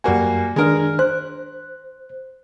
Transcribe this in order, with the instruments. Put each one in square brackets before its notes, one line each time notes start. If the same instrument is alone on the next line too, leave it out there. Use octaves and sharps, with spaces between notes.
[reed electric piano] F#2 G#5 [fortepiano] G3 A#3 F#4
[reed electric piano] D#3 D4 F6 [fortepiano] G#3 A#4
[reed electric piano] C5 [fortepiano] F#6